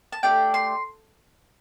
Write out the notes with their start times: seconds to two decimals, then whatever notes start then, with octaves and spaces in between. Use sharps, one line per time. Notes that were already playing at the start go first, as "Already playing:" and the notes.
0.12 A5
0.23 A3 D4 G4 G5
0.54 C6